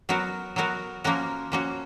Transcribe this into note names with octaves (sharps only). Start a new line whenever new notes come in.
F#3 B3 F#4 A#4
F#3 B3 F#4 A#4
F3 A#3 C#4 F#4 A#4
F3 A#3 C#4 F#4